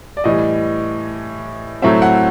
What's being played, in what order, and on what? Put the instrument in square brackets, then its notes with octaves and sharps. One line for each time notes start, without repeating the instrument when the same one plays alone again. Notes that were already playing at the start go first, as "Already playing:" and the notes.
[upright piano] D5
A2 E3 G3 D#5
A2 F#3 A3 C4 E5
F#5